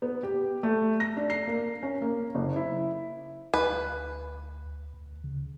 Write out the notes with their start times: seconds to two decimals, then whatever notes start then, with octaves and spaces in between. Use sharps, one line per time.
0.02 B3
0.23 G4
0.63 A3
1.00 A#6
1.17 D4
1.30 C7
1.47 A#3
1.83 C#4
2.02 A#3
2.35 F#1
2.56 E4
3.54 D2 B4
4.94 D2
5.24 C#3